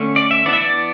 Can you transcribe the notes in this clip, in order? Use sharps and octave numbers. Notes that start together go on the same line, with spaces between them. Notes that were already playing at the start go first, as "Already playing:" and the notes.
Already playing: D3 A3 C#4
D5
E5
E3 B3 D4 D5
E5
D5